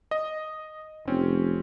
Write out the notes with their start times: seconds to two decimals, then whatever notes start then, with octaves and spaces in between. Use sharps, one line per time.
0.11 D#5
1.08 F1 C4 C#4